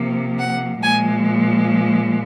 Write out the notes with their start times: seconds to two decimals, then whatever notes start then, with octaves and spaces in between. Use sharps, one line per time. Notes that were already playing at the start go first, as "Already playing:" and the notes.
Already playing: C3 F3 A#3
0.38 F#5
0.82 A#2 F3 G#3 G#5